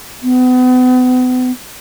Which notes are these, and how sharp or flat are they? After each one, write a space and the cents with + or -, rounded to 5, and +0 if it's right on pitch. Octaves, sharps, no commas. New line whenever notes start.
B3 +35